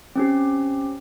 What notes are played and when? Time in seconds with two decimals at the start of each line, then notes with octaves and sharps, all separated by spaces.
0.16 C4 C#4 G4